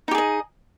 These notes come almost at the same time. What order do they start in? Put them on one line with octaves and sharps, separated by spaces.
D#4 G4 G#4 D#5